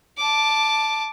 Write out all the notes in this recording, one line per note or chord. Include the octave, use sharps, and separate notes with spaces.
A5 D6